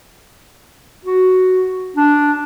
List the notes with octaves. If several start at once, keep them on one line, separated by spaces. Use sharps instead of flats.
F#4
D4